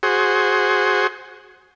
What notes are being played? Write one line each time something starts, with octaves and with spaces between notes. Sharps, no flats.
F#4 G#4 C5